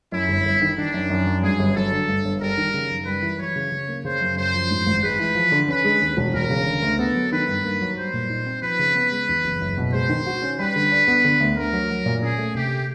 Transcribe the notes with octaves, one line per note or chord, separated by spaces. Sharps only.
F#2 E4
G1
G1
D#3
D#3 D4
F#2
F#2
F#3
G2 G#4
G1
F#3 A4
D3
G2
G1
G3 A#4
D#3
C#3
F#2
G3 B4
E3
F#3 C#5
C#3
C#3
A#3
C#3 C5
F#2
F#2 C5
F3
G#2
G#1
G#3 B4
E3
F3
D3
C#4 B4
G#3
D#2
E1
E1 A#4
C#3
D3
D2
B3 A4
F#3
D#3 B4
G2
A#3
F#3
G3 C5
A#2
D#4
C4
F3 B4
C#3
B3
G#3
E2
F#1
F#1
B2
G#3 C5
D#3
F#4
C#4
G3 B4
D3
D4
B3
D3
D2
D2 A#4
F#3
F#3
A#2
C#4 G#4
A3
C3 G4